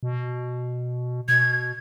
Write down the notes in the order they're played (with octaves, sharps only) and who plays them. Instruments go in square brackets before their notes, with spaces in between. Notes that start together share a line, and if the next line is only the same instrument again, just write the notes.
[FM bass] B2
[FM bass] B2 [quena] G#6